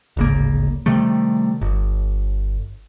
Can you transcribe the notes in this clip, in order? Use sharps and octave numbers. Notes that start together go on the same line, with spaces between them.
D1 G#1 C#3 A#3
C3 D#3 G3 A3
G1